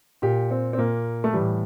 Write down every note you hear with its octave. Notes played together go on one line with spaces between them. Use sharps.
A#2 G4
C4
C4
A#2 A#3
A3
A2 E3 G3